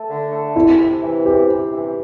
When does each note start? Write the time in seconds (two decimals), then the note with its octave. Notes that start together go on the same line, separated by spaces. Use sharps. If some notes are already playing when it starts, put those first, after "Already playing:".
Already playing: A3
0.09 D3
0.31 A3
0.55 C3 E4
0.79 C3
1.02 E3
1.26 C3 G4
1.49 C3
1.72 E3